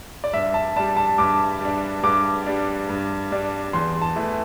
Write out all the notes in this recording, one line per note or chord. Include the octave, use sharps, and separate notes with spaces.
D5
G2 E5
A5
G3 D4 A5
A5
G2 D6
G3 D4
G2 D6
G3 D4
G2
G3 D4
E2 C6
A5
E3 A3